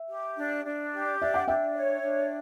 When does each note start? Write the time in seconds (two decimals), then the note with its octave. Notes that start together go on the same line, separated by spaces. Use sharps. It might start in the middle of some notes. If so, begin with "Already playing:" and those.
Already playing: E5
0.10 G4
0.37 D4
0.64 D4
0.92 G4
1.19 D4 E5
1.34 F#5
1.47 D4 E5 G5
1.74 C#5
2.02 D4